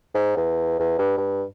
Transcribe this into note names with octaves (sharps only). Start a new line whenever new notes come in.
G#2
E2
E2
G2
G2